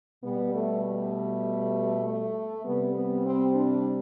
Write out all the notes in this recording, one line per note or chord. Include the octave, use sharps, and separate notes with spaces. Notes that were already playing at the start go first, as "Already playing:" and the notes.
B2 G3 B3
A3
A3
A3
C3 G3 B3
B3
C4
D4